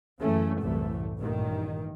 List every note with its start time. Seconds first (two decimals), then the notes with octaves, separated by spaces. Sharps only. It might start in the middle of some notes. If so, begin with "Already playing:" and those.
0.19 F#2 C#3 E3 A3 C#4
0.61 C2 F#2 A2 E3 A3
1.18 A1 G2 A#2 D#3